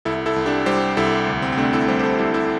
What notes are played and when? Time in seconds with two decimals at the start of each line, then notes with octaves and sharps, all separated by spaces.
0.05 C2 E4 A4
0.26 E4 A4
0.36 C2
0.46 D4 G4
0.66 G3 G4 C5
0.97 C2 E4 A4
1.27 D2
1.42 C4
1.52 C4
1.57 C3 A3 D4
1.73 E4 A4
1.88 G3 G4 C5
1.99 C5
2.03 E4 A4
2.18 G3 E4 A4
2.34 E4 A4